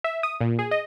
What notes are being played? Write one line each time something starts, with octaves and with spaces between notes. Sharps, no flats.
E5
D#6
A#2
G#4
D#5